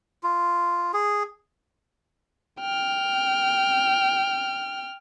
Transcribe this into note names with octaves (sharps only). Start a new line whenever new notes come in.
F4
G#4
G5 F6